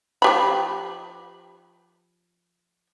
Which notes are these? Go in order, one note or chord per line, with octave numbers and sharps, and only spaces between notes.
F3 G4 B5